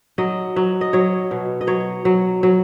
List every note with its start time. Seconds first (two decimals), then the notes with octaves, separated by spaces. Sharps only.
0.18 F#3 D#5
0.56 F#3
0.81 D#5
0.93 F#3 C#5
1.31 B2
1.61 D#5
1.67 F#3 C#5
2.05 F#3
2.43 F#3